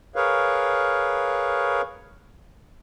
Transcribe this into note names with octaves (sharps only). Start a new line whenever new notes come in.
G#4 A#4 B4 C#5 F5